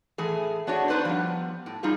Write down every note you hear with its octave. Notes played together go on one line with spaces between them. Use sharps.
A2 E3 A3 G#4
B3 D4 F#4 G#4 C#5
D4 D#4 B4 C5 D5
F3 G3 B3
A2
G3 D#4 F4 G#4